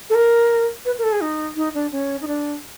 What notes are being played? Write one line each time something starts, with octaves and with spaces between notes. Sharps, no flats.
A4
A#4
B4
A#4
A4
G#4
D#4
D#4
D4
C#4
D#4
D4